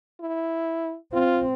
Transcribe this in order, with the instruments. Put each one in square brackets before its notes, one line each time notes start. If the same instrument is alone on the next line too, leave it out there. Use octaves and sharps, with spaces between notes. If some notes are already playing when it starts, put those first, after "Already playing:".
[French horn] E4
[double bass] C4 [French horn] F4